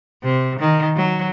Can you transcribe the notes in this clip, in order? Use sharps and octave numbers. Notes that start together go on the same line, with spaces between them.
C3
D#3
F#3